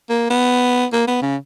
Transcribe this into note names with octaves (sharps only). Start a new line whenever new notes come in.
A#3
B3
A#3
B3
C#3